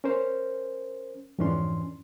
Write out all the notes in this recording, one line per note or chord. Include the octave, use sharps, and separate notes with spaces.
C#4 A#4 C5
F2 G#2 E3 C#4 D4 C6